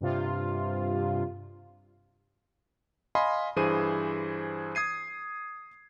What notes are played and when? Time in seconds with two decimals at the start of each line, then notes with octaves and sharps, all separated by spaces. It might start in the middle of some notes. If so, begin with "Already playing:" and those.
0.01 G2 C3 F4
3.15 D#5 F5 G#5 B5 C6
3.56 G2 E3 G#4 C5 G#5 D#7
4.75 D#6 G#6 C7 D#7